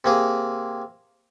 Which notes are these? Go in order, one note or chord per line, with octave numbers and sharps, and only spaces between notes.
C3 A#3 G#4